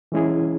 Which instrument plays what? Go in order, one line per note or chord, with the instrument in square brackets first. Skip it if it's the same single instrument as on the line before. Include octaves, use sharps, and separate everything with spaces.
[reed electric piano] E3 G#3 C#4 E4 G#4